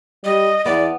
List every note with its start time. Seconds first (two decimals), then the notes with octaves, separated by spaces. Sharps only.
0.24 G3 D#5
0.66 E2 B3 D5